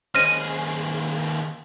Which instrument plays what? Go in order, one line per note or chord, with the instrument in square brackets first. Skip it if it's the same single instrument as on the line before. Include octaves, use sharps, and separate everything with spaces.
[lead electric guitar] D#2 G#4 [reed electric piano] C#4 C5 D#5 [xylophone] F6 A#6 D#7